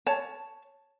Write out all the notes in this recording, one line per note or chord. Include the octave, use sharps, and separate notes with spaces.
C#5 A5